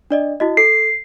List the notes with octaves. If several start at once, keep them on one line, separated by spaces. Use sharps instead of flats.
D4 D5 D#5
E4 F#4 D#5
A4 C7